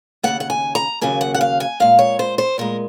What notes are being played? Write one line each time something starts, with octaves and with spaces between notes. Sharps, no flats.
D#2 C#3 F#3 A#3 F#5
F#5
G#5
A#5
D#2 C#3 F#3 A#3 G#5
F#5
F#5
F5
G#5
A#2 G#3 F5
C#5
C5
C5
A#2 G#3 A#4